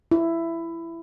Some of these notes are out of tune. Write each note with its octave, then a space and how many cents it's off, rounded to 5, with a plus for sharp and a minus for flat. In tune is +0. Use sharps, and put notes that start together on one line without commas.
E4 +15